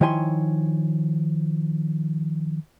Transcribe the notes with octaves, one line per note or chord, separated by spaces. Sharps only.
D#3 F3 E4 C#5 G#5 C6